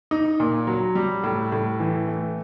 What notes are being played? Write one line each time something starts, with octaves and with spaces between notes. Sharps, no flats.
D#4
A#2
F#3
G3
A2
A2
E3
A3